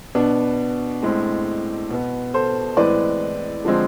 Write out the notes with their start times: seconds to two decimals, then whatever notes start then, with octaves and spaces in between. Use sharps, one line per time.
0.15 B2 B3 D4
1.03 A2 G#3 C4
1.90 B2 B3
2.34 A4 C5
2.77 A2 E3 G#3 C4 B4 D5
3.65 D3 F3 G#3 C4